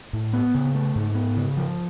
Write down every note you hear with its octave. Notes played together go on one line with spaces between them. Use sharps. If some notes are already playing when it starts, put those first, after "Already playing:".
A2
B3
C#3
A3
G#2
B3
C#3
F3